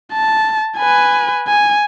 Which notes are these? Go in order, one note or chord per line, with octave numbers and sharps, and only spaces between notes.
A5
B4 G#5
G#5